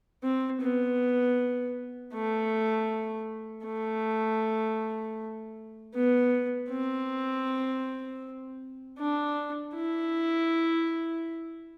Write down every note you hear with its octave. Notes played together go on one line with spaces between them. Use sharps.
C4
B3
A3
A3
B3
C4
D4
E4